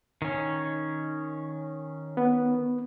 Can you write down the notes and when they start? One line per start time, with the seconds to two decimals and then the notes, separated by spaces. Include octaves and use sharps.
0.22 D#3 C#4
2.17 B3